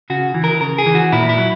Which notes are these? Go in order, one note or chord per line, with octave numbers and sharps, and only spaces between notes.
C#3 F#4
E3
A#4
C#3 A#4
G#4
E3
F#4
A#2 E4
E4
F#3